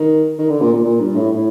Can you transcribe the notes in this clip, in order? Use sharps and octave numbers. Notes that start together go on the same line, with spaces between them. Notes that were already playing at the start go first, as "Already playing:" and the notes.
Already playing: D#3
D#3
D3
A#2
A#2
A#2
G2
A2
A2